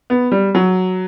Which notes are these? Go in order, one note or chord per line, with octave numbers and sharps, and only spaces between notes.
B3
G3
F#3